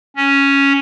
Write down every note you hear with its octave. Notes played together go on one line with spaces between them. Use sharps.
C#4